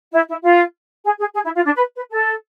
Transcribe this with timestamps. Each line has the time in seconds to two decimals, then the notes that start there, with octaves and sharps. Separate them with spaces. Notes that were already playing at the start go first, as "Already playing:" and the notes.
0.13 E4
0.28 E4
0.43 F4
1.04 G#4
1.19 G#4
1.34 G#4
1.44 E4
1.55 F4
1.65 D4
1.75 B4
1.95 B4
2.10 A4